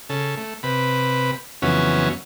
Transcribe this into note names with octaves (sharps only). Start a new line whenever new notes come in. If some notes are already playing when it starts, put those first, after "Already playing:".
C#3 A4
A3
C3 B4
F2 C#3 E3 F#3 B3 C#4